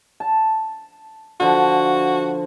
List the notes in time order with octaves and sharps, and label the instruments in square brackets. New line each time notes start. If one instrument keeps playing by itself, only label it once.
[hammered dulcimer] A5
[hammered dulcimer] D3 F3 [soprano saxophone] F#4